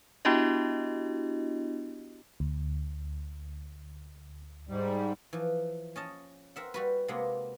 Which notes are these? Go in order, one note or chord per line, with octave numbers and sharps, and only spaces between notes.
B3 D4 E4 F#4 G4 D#5
D2
G#2 G3
E3 F3
C#4 D#5 A5
C4 A#4 E5 F#5
G3 F#4 B4
C3 G#3 A#3 B3